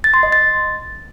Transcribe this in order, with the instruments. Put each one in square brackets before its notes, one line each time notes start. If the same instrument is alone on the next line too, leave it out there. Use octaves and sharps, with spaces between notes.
[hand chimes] A6
C6
D#5
A6